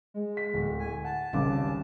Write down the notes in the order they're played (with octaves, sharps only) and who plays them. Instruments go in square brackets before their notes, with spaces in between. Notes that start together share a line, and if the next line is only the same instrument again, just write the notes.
[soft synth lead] G#3
[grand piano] B6
D1
[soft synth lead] G#5
[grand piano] F#5 [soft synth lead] A5
[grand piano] G#1 C#2 D6 [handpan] G3 C4 C#4